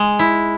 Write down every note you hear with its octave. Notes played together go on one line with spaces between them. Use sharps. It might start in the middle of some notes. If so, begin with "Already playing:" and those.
Already playing: G#3
E4